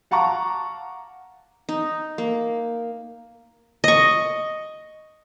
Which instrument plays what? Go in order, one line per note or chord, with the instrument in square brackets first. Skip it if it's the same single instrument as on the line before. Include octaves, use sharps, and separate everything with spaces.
[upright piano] F5 F#5 A5 A#5 C#6 D6
[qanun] D#4
A#3
D#5 C#6